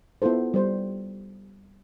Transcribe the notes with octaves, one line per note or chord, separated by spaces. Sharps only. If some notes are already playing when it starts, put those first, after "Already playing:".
B3 E4 F4 A4 C5
G3 C5